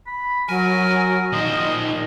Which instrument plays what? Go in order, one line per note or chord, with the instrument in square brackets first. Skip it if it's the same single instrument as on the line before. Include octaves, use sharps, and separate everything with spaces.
[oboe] B5
[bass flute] F#3 [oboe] A#4 [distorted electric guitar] G#5
[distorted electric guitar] A#2 C5 [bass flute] D#3 [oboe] D#5